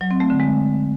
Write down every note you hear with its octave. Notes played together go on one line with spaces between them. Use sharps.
F#3
C4
A3
D3
G#3